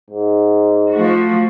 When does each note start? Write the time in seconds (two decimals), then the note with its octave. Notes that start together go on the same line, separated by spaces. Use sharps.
0.10 G#2
0.90 F3 A3 F#4